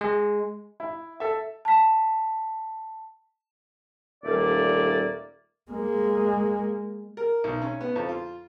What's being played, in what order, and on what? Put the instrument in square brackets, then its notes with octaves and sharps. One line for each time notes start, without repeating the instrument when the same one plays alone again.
[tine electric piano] G#3
[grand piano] E4
A4 E5
[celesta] A5 B6
[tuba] D#1 [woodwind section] A3 A#3 D5
[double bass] G#3 A#3
[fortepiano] A#4
B1
C#4
B3
F2
F4